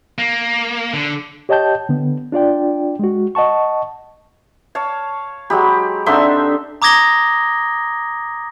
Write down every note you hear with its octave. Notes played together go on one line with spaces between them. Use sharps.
A#3
D3
G4 C#5 D#5 G5 A5 G6
D3 B3
D4 F4 D5 G5
G#3 F#4
D#5 F#5 A5 C#6
C#5 F5 A5
F#3 G#3 G4 B5
D3 C4 D4 D#4 E5 C6
A#5 D6 D#6 G#6 A#6 G7